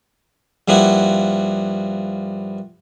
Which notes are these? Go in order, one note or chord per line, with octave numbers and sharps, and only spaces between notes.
G2 F3 A#3 E4 F#4